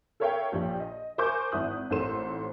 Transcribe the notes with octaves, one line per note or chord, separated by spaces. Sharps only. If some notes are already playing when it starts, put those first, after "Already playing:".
A4 A#4 C#5 E5 F5 G5
A#1 F3 G4
D#5
A#4 C5 G#5 C#6 D6 G6
G#1 E4 D#6 F#6
A1 C4 D#4 A4 C6 E7